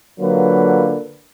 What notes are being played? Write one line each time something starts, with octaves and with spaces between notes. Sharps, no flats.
D3 F#3 A#3 F4 A#4 B4